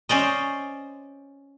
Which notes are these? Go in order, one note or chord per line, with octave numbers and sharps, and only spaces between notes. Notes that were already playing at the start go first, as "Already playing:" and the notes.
C#4 C5 D5 D#5